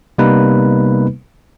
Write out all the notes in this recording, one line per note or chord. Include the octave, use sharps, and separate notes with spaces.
C3 G3 A#3 B3 D#4 B4